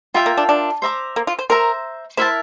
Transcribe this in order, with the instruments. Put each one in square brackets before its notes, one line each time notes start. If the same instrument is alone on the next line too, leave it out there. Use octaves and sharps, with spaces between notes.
[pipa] G3 [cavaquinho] F4 A#4 E5 G5
[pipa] A#3
D4
D4
[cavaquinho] C5 E5 A#5 D6
[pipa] A#3
F4
C5
[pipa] A#4 [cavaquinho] C5 E5 A#5
[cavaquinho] E4 A#4 E5 A5 [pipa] C5